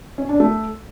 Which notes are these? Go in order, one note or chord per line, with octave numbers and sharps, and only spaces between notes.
C#4
D4
A3